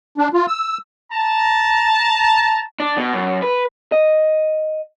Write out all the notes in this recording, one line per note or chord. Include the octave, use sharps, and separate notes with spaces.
D4
F4
E6
A5 A#5
D4
B2
F#2
B4
D#5